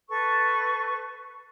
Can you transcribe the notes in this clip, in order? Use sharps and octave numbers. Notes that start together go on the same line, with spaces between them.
A4 B4 C#6